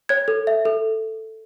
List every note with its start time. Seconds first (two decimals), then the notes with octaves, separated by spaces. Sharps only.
0.09 C#5 G#6
0.28 A4
0.47 E5
0.65 A4